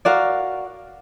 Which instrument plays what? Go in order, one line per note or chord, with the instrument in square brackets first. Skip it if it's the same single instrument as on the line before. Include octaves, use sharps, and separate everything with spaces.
[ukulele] F#4 A#4 D5 F5